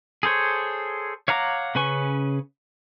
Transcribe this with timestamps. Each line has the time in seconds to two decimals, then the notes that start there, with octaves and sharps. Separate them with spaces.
0.23 G#4 A4 C5 C#5
1.28 C#5 F5 F#5 A#5 D6
1.75 C#3 C#4 B4 G#5 C#6